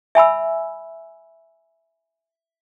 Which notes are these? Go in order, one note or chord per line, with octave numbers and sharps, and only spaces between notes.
E5 G#5 B5 E6